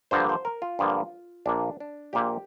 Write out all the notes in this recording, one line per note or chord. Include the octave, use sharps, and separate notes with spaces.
G2 D3 F3 A#3 C5
C5
A#4
F4
G2 D3 F3 A#3
A#1 A#2 A#3 D4
D4
A#1 A#2 A#3 G4